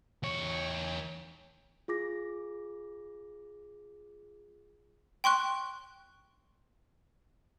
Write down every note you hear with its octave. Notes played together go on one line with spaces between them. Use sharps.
E2 C#5
F4 G#4 D6 A#6
G5 C6 C#6 F#6